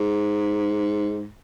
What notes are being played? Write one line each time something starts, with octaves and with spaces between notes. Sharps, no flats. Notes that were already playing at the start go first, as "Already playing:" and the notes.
Already playing: G#2